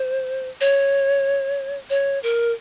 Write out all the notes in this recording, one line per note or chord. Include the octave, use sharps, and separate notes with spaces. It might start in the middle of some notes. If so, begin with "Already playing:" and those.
Already playing: C5
C#5
C#5
A#4